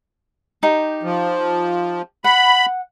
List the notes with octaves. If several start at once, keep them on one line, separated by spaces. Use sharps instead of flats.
D#4 G4
F3
F#5 B5